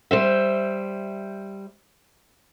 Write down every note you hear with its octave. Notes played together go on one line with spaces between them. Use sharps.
G3 C5 E5